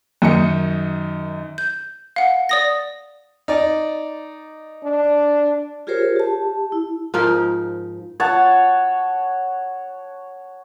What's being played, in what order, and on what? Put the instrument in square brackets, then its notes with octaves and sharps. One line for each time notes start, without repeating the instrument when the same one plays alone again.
[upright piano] F#2 D#3 D#4 D#5 C#7
[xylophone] G6
F5 F#5
D5 D#6 A#6
[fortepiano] D#4 D5
[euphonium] D4
[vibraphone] F4 G4 G#4 A#4 C5 C#5
G4 A5
E4
[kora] G#2 F3 D#4 A#4
[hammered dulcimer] C#5 F#5 A5